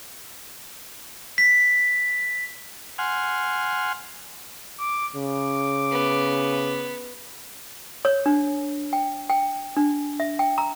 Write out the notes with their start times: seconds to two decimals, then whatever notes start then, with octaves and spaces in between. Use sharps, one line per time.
1.38 B6
2.98 F#5 G#5 C6 F6
4.80 D6
5.15 C#3 D6
5.92 B3
8.05 C#5
8.26 D4
8.93 G5
9.30 G5
9.77 D4
10.20 E5
10.39 G5
10.58 A#5